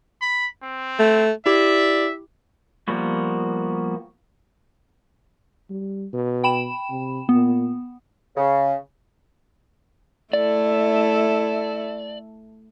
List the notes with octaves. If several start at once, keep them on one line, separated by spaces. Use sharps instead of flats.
B5
C4
A3
E4 G4 D5 E5
F3 G3 A#3 B3 F#4
G3
B2
G5 B5 E7
C3
A#2 B3
C#3
A3 E4 A4 D5